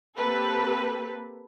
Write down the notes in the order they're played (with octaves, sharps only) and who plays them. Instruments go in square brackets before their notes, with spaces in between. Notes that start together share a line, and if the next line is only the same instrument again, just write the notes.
[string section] A#3 C4 G4 A4 B4